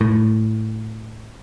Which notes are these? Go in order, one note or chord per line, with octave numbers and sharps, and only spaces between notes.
A2